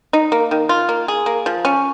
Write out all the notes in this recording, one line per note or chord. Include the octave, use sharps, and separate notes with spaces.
D#4
A#3
D#3
F4
A#3
G#4
A#3
F3
C#4